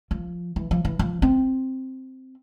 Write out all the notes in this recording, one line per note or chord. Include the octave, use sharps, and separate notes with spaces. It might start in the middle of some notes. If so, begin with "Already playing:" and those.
F3
E3
F3
E3
F3
C4